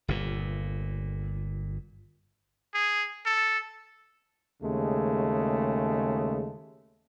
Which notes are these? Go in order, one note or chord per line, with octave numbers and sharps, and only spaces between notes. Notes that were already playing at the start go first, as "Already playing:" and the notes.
G1 A#2
G#4
A4
D#2 C#3 G#3 A3